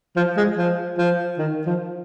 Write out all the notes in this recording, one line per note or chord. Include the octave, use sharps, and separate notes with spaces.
F3
G#3
F3
F3
D#3
F3